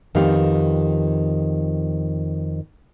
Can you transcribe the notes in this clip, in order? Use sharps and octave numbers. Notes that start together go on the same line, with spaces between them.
F2 D#3 B3 G4 F5 G5